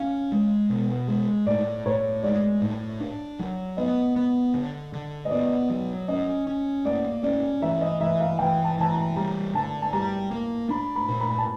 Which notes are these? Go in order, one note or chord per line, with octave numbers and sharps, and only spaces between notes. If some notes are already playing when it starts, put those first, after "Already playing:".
Already playing: C#4 F5
G#3
B2
G#3
A2 D5
A2 C#5
G#3 D5
A2
D4
F#3
B3 D#5
B3
D3
D3
D#5
B3 D5
F#3
C#4 D#5
C#4
A#3 D5
C#4 D5
E3 E5
D#5
E3 E5
F5
E3 G5
A5
E3 A5
A#5
G3 A#5
D3 A5
A5
G3 A#5
A#3
D4 B5
B5
A#2
B5
A5